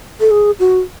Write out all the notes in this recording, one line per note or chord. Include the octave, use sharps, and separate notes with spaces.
A4
G#4
F#4